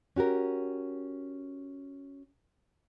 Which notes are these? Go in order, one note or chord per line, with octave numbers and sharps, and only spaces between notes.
C#4 F#4 G4 A#4